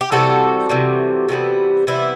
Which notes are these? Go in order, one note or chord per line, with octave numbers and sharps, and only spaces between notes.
G4
C3 E3 G3 F#4 A4
C3 E3 G3
C3 E3 G3 B3
C3 E3 G3 B3 E4